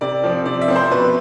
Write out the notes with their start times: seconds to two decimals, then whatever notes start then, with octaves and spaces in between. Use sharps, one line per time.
0.01 C3 D5
0.24 F3 C4
0.46 C3 D5
0.61 E5
0.68 F3 C4
0.76 C5
0.91 B2 B4